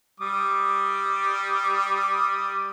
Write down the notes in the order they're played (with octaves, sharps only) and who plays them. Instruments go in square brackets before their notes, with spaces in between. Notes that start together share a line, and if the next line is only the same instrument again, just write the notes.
[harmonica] G3 D6 D#6